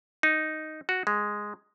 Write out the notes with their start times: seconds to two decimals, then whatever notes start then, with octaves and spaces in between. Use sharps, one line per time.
0.23 D#4
0.89 F#4
1.07 G#3